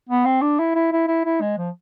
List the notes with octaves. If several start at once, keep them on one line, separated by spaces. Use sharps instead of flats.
B3
C4
D4
E4
E4
E4
E4
E4
G#3
F3